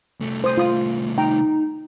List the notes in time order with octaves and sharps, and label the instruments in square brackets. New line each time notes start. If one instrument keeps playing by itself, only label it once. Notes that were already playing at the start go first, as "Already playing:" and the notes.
[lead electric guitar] C2 A3
[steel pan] C5 D#6
F4 D#6
[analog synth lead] D#4 [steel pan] G5 A#5